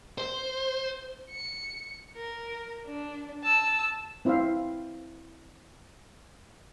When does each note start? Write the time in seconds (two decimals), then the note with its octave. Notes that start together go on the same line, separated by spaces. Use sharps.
0.18 C5
1.29 C#7
2.16 A#4
2.86 D4
3.43 A5 E6
4.25 C4 E4 C5 E5 F5